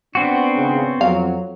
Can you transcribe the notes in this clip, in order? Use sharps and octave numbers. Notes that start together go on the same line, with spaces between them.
B3 C4 D4 F#4
G#1 C#3
F2 F#3 F5